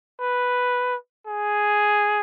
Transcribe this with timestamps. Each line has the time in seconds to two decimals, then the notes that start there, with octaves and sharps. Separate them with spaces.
0.21 B4
1.27 G#4